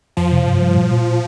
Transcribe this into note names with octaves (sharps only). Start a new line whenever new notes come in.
F2 F3
C3
G2
G3
A#2
A#2